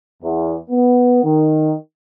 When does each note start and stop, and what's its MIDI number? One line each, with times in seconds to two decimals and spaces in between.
0.23 0.55 40
0.70 1.23 59
1.23 1.73 51